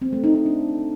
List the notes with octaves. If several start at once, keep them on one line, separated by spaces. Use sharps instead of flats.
C4
A3
D#4
D#4
D4